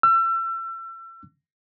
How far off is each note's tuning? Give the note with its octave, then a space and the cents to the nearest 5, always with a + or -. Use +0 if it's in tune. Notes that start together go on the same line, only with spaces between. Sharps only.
E6 +35